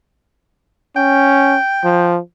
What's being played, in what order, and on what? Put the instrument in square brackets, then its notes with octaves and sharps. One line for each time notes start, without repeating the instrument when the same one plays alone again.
[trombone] C#4 [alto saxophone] G5
[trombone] F3